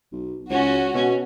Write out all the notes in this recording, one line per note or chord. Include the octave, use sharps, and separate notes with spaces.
B1
C#2 C#4 F#4
B2 C#4